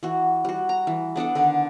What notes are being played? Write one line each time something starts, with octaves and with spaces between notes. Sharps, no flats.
E3 F#4
G3 F#4
A#5
E3
B3 D4 A4 F#5
D3 D#3 D4